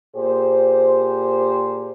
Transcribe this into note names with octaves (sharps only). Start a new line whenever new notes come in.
A#2 G4 G#4 C5